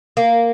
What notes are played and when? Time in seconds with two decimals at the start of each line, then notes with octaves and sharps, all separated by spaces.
0.17 A#3